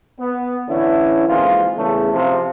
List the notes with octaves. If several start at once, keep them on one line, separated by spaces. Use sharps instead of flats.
B3
D3 E3 C#4 E4
G#1 F2 E3 G#3 A#3 F4
E2 C#3 A3
C3 F3